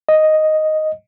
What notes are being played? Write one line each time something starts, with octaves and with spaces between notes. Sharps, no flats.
D#5